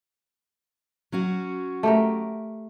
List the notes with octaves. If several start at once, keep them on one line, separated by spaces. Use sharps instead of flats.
F#3 C#4 F#4
A3 G4 A#4